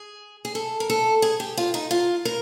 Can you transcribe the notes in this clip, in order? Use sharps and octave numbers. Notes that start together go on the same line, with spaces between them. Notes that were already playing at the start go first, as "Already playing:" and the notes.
Already playing: G#4
G#4
A4
A#4
A4
G#4
G4
F4
D#4
F4
A#4